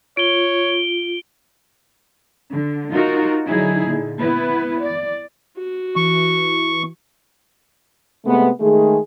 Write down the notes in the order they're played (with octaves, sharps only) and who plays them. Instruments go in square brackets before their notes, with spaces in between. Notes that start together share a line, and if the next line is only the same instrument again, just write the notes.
[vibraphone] F4 [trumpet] C#5 [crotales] D7 G7
[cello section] D3
D#4 F4 F#4 A#4
D3 F#3 D#4 E4 G#4
A#2 D3
B3 E4 B4
D5
[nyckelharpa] F#4
[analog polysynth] E3 [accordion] C#6
[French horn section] C3 G#3 A3 B3
D#3 G#3 A3 G#4